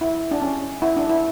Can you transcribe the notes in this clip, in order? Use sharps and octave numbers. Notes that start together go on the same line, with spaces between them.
E4
D4
C#4
E4
D4
E4